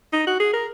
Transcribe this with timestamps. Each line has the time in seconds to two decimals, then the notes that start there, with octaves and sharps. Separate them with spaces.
0.13 D#4
0.27 F#4
0.40 G#4
0.53 A#4